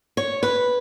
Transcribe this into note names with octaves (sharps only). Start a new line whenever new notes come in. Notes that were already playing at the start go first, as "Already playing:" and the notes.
C#5
B4